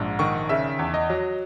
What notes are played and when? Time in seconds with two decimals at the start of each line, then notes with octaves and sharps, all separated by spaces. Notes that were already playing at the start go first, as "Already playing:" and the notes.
Already playing: A#1 G#2
0.19 D#3 C#6
0.49 C#3 E5
0.79 E2
0.94 D#5
1.10 F#3